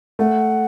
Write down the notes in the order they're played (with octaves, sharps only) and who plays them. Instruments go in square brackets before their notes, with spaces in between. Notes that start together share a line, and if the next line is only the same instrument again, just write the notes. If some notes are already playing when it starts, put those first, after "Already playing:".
[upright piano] A3 [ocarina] F#5